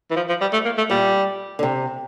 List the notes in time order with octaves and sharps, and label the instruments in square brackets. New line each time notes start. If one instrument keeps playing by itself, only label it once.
[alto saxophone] E3
F3
F3
G3
A3
A#3
A3
[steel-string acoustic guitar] A#2 [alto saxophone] G3
[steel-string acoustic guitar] D3
C3